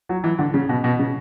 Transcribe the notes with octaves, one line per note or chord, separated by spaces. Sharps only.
F#3
E3
D3
C#3
B2
B2
C#3